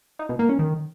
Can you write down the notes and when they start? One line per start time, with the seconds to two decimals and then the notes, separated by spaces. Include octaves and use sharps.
0.19 D#4
0.29 B2
0.39 A#3
0.49 C#4
0.59 D#3